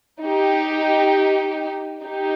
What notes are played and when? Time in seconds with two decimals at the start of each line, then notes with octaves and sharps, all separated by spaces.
0.21 D#4 G4
2.02 D#4 G4